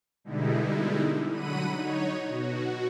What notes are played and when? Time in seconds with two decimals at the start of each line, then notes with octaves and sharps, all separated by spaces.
0.24 B2 D3 G3 G#3 D#4 E4
1.31 D3 F#3 F#5 B5 D#7
1.73 D#4 C#5
2.27 B2 F#4